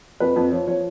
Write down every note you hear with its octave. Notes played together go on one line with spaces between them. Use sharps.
F2 B4
F2
F3 C#5
F3 C#5